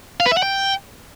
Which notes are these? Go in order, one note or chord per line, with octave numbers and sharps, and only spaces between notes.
F5
B4
E5
F#5
G5